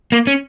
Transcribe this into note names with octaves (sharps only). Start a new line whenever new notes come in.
A#3
C#4